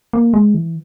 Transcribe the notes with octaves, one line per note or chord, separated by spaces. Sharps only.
A#3
G#3
E3